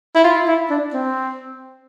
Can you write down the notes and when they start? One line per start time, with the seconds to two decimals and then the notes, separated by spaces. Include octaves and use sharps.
0.15 E4
0.24 F4
0.48 E4
0.70 D4
0.94 C4